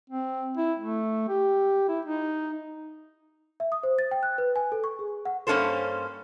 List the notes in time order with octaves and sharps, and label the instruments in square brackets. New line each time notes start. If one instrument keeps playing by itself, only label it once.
[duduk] C4
E4
A3
G4
E4
D#4
[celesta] E5
D#6
C5
A6
G5
F#6
B4
G#5
A4
C#6
G#4
F#5
[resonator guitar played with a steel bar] G2 A#3 C#4 F4 A4 C5